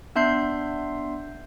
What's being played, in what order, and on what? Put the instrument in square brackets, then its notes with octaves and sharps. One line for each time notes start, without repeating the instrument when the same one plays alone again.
[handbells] B3 D4 E5 C6 G6 C7